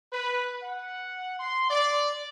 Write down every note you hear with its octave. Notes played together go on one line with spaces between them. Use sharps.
B4
F#5
C6
D5